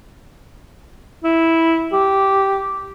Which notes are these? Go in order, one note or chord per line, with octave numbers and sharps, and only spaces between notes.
E4
G4